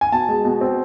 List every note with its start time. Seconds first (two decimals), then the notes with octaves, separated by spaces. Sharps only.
0.01 G#5
0.12 B2 A5
0.29 G#3
0.45 B2
0.61 C4